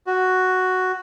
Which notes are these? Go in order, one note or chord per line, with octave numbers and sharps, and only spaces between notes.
F#4